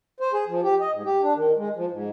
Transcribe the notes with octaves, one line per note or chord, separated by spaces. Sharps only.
C5
G#4
F3
G4
D#5
G#2
G4
D4
D#3
G#3
F3
G#2